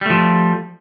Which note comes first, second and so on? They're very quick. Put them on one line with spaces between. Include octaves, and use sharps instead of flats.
G3 A3 F3